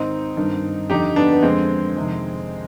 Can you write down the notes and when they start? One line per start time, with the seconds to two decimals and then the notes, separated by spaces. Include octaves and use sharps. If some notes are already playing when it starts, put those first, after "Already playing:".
Already playing: G#2 D#3 C4 D#4
0.37 G2 D#3
0.90 F2 D3 D#4 G4
1.16 B3 D4
1.33 B3
1.43 F2 D3 G#3 C4
1.97 F2 C3 D#3